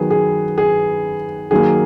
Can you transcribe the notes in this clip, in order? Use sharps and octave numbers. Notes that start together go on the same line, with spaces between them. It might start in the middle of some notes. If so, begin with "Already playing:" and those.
Already playing: D#3 F#3 B3 G#4
G#4
G#4
D#3 F#3 A#3 G#4